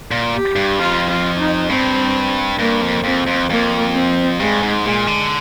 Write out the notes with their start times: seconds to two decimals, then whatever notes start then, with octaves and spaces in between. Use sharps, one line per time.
0.11 A#2
0.34 G4
0.56 G2
0.79 F2 F4
1.09 F4
1.39 D#4
1.69 G2 C4
2.59 G2 A#3
2.82 F2
3.04 F2 C4
3.27 F2
3.50 F2 A#3
3.94 C4
4.40 G2 G#3
4.63 G#2
4.85 A#2 G#3
5.07 D3